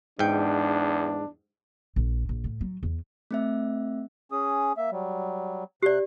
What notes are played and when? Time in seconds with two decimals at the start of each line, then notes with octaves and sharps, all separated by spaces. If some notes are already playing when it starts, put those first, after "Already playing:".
0.19 E2 G#2 D4 G5
1.96 A#1
2.29 A#1
2.44 A2
2.61 F#3
2.83 E2
3.31 A3 C4 E5
4.32 C#4 G#4 D#6
4.77 A#3 E5
4.91 F#3 G3
5.83 C3 G4 D5 F#6